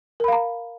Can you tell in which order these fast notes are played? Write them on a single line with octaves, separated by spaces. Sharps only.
A#4 B5 F5 A#5